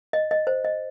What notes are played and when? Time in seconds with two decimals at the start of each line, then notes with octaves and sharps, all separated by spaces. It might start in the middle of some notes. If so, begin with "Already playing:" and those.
0.13 D#5
0.31 D#5
0.47 C5
0.65 D#5